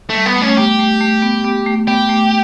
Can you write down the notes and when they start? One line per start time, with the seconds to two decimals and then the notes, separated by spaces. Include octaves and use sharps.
0.10 A3
0.15 G3
0.26 B3
0.36 A3
0.42 C#4
0.49 A3
0.57 B3 G4
0.79 A3
1.01 A3
1.22 B3
1.44 B3
1.66 A3
1.87 B3 G4
2.09 A3